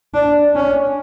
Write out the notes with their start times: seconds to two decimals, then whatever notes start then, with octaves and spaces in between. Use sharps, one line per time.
0.14 D4
0.55 C#4